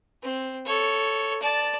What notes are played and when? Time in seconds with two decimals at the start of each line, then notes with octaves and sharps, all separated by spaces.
0.22 C4
0.65 A4 C#5
1.42 D5 A5